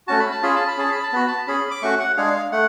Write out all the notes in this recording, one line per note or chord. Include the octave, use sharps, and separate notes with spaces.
A3 C#4 F#4 A5
B5
A5
C#4 F4 G#4 B5
A5
B5
C#4 G#4 A5
B5
A5
B3 F#4 B5
A5
C#4 G#4 B5
D6
A3 C#4 F#4 C#6
F#5
G#3 D4 G#4 F5
A3 F#5